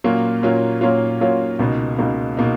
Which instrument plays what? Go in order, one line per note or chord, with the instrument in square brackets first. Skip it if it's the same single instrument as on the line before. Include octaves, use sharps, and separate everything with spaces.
[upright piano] A#2 F#3 A#3 C#4 F4
A#2 F#3 A#3 C#4 F4
A#2 F#3 A#3 C#4 F4
A#2 F#3 A#3 C#4 F4
C#2 B2 A#3 D#4
C#2 B2 A#3 D#4
B2 A#3 D#4